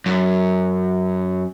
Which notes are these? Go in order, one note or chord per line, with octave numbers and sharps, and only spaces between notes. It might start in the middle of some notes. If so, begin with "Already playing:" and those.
F#2